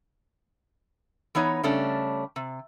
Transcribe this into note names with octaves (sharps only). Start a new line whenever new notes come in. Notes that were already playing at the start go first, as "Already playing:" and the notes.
E3 B3 D#4 C#5
C#3 G3 A3 C#4 D4
C3